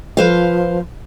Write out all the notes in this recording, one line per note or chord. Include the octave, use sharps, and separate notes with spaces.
F3 B4 C5 F5